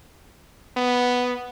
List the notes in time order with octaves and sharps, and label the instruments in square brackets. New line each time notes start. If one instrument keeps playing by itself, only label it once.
[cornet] B3